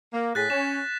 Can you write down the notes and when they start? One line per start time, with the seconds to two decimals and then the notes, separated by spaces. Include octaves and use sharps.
0.14 A#3
0.35 A2 G#4 F#6 A6 B6
0.50 C#4 E7